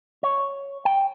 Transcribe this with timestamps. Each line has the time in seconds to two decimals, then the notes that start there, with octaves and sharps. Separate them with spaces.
0.23 C#5
0.85 G5